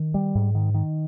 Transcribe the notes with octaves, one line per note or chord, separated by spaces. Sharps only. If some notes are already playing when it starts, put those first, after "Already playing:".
Already playing: D#3
G3
G#2
D#3
D#3